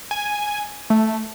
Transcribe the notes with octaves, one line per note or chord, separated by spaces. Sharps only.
G#5
A3